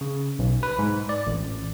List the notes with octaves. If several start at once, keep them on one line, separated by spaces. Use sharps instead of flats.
C#3
B1
B4
G#2
D5
A1